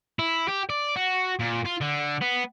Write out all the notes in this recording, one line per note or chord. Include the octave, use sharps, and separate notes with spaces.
E4
G4
D5
F#4
A#2
F4
D3
B3